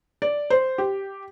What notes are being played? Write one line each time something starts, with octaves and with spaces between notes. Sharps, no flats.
D5
C5
G4